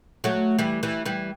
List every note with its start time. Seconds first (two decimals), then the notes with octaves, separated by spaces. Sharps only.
0.24 F#3 A3
0.59 E3 G3
0.83 E3 G3
1.06 E3 G3